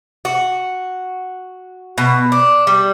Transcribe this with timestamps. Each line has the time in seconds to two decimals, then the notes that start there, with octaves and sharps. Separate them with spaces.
0.25 F#4
1.98 B2
2.32 D4
2.67 G3